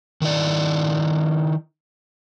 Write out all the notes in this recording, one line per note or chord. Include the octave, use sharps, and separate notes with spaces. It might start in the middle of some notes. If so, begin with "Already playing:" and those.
D#3 D#4 E4 D5